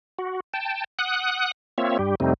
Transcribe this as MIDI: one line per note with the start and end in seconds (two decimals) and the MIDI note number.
0.19 0.40 66
0.54 0.84 79
0.54 0.84 81
0.99 1.51 78
0.99 1.51 87
0.99 1.51 90
1.78 1.98 58
1.78 1.98 60
1.78 1.98 65
1.78 1.98 73
1.78 1.98 76
1.99 2.15 43
1.99 2.15 55
1.99 2.15 67
2.20 2.34 41
2.20 2.34 48
2.20 2.34 55
2.20 2.34 57
2.20 2.34 60
2.20 2.34 63